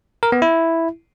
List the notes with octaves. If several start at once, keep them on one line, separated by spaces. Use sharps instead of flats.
A#4
B3
E4